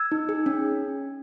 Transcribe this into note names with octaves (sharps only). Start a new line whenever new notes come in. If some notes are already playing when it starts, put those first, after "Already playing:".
Already playing: E6 G#6
D#4
G#4
C#4